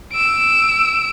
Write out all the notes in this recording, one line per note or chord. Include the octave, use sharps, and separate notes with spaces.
E6 D7